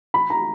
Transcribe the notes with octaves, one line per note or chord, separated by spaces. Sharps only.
B5
A#5